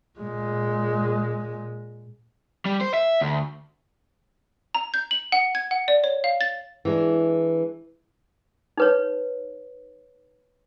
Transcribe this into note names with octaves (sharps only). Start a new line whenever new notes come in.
A#2 G#3
G3
C5
E5
D2
A#5
G6
F#7
F#5
G#6
F#5
D5
C#5
F5
A6
E3 G#3 D4
D#4 B4 C#5